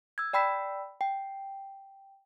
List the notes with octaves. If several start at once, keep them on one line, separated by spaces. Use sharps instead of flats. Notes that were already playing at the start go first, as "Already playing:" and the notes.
E6 G#6
D5 G5 B5 E6 B6
G5